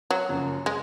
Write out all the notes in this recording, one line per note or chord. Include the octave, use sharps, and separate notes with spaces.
F#3
F#1 F#2 F3
G#3